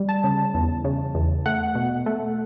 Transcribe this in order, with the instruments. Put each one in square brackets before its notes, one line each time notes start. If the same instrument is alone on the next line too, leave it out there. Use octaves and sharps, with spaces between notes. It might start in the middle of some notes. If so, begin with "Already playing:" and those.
Already playing: [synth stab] G3
A5
C#3
E2
C#3
E2
A3 F#5
B2
A3